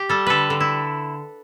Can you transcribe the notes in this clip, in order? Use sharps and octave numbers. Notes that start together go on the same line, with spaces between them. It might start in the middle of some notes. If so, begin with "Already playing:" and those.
Already playing: G4
G3 A4
D3 A4 B4
D3
E4